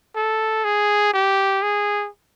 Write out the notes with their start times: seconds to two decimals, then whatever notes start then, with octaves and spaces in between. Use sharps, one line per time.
0.16 A4
0.65 G#4
1.14 G4
1.63 G#4